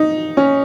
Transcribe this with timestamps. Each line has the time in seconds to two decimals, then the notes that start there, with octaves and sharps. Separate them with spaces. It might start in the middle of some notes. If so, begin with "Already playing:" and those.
Already playing: D#4
0.37 C#4